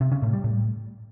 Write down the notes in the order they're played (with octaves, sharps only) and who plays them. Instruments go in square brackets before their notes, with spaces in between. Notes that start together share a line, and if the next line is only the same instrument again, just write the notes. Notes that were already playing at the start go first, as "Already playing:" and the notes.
[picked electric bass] C3
C#3
A2
G3
A2